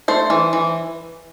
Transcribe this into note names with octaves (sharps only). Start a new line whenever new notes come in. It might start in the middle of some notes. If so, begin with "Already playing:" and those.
A3 C5
E3
E3